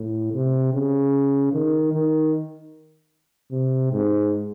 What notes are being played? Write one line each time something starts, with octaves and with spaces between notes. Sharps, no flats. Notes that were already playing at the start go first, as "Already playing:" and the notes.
Already playing: A2
C3
C#3
D#3
D#3
C3
G#2